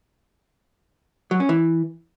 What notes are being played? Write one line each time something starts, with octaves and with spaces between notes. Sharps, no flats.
F#3
C#4
E3